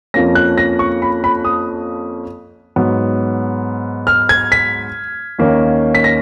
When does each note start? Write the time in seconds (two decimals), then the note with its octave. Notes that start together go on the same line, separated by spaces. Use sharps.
0.14 F2 F3 A#3 C#4 A#6
0.35 F#6
0.58 A#6
0.79 C#6
1.02 B5
1.24 B5
1.45 D#6
2.76 G#2 F#3 B3
4.07 F6
4.29 G#6
4.52 B6
5.38 D#2 D#3 A#3 C#4
5.95 B6
6.04 A#6